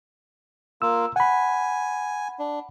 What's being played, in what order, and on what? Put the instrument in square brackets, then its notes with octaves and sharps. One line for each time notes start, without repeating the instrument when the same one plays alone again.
[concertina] A#3 F4 [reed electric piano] E6
[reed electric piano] F#5 B5 [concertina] G#5
[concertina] D4